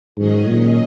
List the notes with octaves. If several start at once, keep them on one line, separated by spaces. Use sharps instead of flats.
G#2 D#3 F#3 C#4 G#4 D#5
A#2